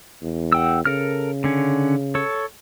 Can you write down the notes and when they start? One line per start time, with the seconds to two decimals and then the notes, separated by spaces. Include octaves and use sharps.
0.22 E2
0.52 F#5 G5 E6
0.85 C#3 A4 A#4 F6
1.44 D3 C#4
2.15 A4 C#5